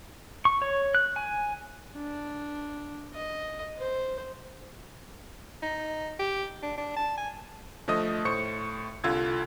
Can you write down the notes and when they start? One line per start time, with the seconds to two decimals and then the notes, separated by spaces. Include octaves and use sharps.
0.45 C#6
0.62 C#5
0.95 F#6
1.16 G#5
1.97 D4
3.14 D#5
3.78 C5
5.63 D#4
6.19 G4
6.62 D4
6.77 D4
6.96 A5
7.17 G#5
7.88 D3 F3 A3 D#5 D#6
8.25 A2 C5 C#6 C#7
9.04 C2 D3 F4 E6 G#6